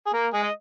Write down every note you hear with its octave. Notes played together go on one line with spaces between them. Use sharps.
G#4
A#3 A#4
G#3 G#4
D#5